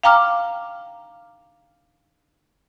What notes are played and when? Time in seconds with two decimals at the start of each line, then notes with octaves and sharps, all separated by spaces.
0.04 F5 G5 A#5 D6 F6